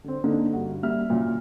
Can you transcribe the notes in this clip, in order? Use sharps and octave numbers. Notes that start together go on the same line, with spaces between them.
D3 C4
D3 A#3 D4 D#4
G2 F#4
G3 A#3 E5 F6
A#2 C#3 F#3